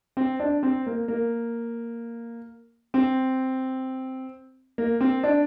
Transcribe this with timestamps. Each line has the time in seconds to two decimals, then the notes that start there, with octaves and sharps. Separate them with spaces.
0.17 C4
0.40 D4
0.63 C4
0.86 A#3
1.08 A#3
2.94 C4
4.78 A#3
5.01 C4
5.23 D4